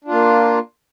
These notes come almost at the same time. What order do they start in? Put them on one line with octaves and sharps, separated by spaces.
D4 F4 A#3